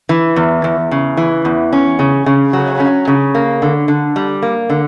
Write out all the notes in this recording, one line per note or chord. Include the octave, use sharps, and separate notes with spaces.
E3
E2
E2
C#3
E3
E2
C#4
C#3
C#3
F#3
C#4
C#3
A#3
D3
D3
G3
A#3
D3